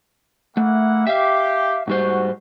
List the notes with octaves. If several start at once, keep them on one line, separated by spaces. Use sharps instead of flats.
A3 A#3 E4 F#5
G4 E5 F5
G#2 G3 F#4 C5